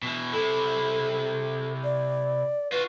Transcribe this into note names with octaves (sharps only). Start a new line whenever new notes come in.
B2 E3
C3 E4 A4
D5
F4 F#4 B4